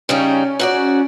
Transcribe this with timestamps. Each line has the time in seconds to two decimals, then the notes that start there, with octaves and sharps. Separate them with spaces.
0.09 C#3 G3 C#4 D#4
0.59 G#2 F#4 D5